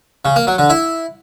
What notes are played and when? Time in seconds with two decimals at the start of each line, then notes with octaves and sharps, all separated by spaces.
0.25 C#3
0.36 A#3
0.47 F#3
0.58 D3
0.70 E4